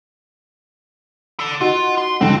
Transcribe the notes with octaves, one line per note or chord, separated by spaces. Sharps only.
A4 D5
D#4 F4 F#4
C6
C#2 G2 D3 C4